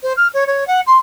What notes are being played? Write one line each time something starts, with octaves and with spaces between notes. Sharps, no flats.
C5
F6
C#5
C#5
F#5
C6